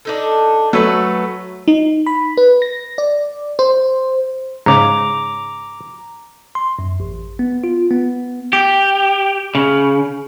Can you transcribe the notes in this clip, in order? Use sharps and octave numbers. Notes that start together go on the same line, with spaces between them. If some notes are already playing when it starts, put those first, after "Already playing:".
D4 D#4 A4
F#3 A3 A4 B4 F#5
D#4
B5
B4
A#6
D5
C5
G#2 C#3 A#5 D6
C6
F#2
A1
B3
F4
B3
G4
C#3